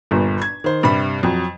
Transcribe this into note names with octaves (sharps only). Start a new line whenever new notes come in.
G1 G2 A#2
G#6
D#3 C5
G2 C3 G3 B5
F2 F#3